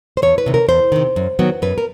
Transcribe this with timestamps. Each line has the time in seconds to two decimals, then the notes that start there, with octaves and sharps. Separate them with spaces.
0.17 C5
0.22 E2 C#5
0.38 B4
0.46 C3 D#3
0.54 A#4
0.68 E2 C5
0.92 C3 D#3
1.16 F#2
1.39 D#3 F#3 B3
1.62 F#2 B4
1.78 A#4